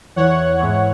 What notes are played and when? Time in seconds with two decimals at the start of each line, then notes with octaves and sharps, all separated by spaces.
0.16 E2 E3 C#5 F#5
0.59 G#2 E3